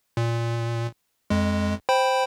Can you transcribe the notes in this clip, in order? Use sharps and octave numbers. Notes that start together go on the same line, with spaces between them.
A#2
F2 G#3
C5 G5 B5